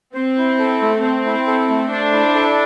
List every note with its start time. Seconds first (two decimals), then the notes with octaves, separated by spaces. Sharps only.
0.15 C4 C5
0.38 E4
0.59 A4
0.82 A3
1.03 C4 C5
1.26 E4
1.47 A4
1.70 A3
1.91 D4 C5
2.13 E4
2.35 A4